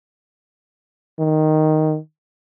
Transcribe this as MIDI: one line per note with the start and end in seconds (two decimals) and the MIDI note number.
1.20 1.98 51